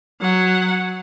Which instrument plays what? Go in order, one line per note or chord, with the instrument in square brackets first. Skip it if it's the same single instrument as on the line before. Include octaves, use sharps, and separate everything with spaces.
[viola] F#3 F#5